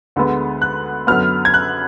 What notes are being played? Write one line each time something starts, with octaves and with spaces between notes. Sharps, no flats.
D2 D3 G#3 B3
F#6
F#2 D3 F#3 B3 F6
G#6
F#6